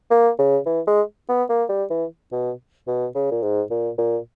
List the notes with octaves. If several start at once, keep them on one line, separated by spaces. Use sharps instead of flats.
A#3
C#3
E3
G#3
B3
A#3
G3
E3
B2
B2
C#3
A#2
G#2
A#2
A#2